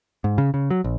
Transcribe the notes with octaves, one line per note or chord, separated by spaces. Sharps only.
G#2
C#3
C#3
F#3
A#1